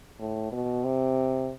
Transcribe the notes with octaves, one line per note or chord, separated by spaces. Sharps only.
A2
B2
C3